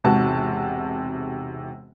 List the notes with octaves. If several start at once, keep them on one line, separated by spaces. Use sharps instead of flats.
E1 G#2 C3 F#4 A5